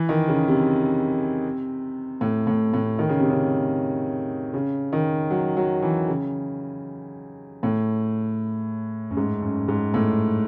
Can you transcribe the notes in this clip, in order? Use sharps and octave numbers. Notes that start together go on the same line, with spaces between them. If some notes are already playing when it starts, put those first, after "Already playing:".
Already playing: E3
D#3
C#3
C3
A2
A2
A2
D#3
C#3
C3
C#3
C#3
D#3
F#3
F#3
E3
C#3
A2
F#2
G#2
F#2
G#2
A2